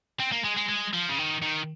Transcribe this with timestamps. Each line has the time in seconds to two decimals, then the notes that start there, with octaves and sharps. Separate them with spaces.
0.20 C4
0.32 A#3
0.44 G#3
0.57 G#3
0.69 G#3
0.93 F3
1.09 C#3
1.18 D#3
1.42 D#3